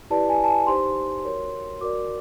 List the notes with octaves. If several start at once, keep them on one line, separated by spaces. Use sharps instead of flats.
E4 G4 B4 D5 A5
G#5
A5
G#5
D#4 G4 C5 C6
F#4 A#4 C#5
F#4 A#4 D5 D6